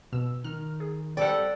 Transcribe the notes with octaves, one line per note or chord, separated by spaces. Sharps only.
B2 E6
D#3 F6
G#4
G3 C4 A4 D5 F#5 G5